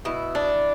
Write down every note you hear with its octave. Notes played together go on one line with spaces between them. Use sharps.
B2 E4
D4